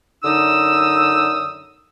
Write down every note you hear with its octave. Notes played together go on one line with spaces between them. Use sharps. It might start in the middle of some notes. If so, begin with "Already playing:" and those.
F#2 D3 D#4 D#6 E6